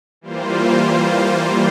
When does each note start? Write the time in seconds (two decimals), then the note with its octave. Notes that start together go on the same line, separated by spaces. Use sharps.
0.21 E3 G3 A#3 F4 C5